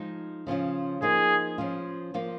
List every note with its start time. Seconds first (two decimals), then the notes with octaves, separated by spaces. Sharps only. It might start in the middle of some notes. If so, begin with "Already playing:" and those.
Already playing: F3 G#3 D#4
0.47 C#3 F3 C#4 F4
1.02 F3 A#3 D#4 G#4
1.58 F3 C#4 F4
2.14 F3 A#3 F4